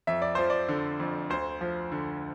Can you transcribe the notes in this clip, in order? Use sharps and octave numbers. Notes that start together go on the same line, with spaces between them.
F2 E5
D5
F3 C5
D5
D3
F2
D2 C5
F3
D3